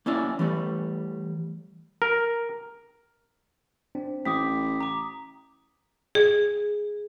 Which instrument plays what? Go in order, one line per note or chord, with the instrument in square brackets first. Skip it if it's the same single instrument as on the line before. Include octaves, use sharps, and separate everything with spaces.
[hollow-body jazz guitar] A#3 C#4 E4 D5
E3 G3 A3
[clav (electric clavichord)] A#4
[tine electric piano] C4 D4
[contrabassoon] A1 [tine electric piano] G5 [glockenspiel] D6 D#6 B6
[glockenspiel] A#5 D6
[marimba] G#4